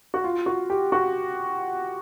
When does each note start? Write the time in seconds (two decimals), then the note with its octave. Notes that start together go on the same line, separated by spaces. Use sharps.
0.14 F#4
0.24 F4
0.46 F#4
0.70 G4
0.92 F#4